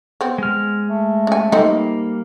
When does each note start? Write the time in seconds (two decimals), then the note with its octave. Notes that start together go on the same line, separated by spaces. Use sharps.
0.21 B3 C4
0.38 G#3 F6
0.87 A3
1.27 C#3 G#5
1.52 G3 A#3 C4 D#4 A4